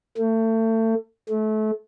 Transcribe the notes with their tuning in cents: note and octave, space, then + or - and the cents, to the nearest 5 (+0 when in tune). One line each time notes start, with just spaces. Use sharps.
A3 +30
A3 -30